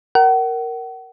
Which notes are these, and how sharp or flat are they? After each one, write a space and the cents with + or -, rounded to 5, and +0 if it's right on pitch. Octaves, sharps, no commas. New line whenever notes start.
A#4 +0 F#5 +40